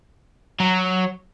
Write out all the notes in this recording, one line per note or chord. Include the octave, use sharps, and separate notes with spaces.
F#3